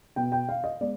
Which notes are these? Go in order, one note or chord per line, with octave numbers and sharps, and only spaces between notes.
B2 B3 G5
G5
F5
D#5
G#3 B3 D5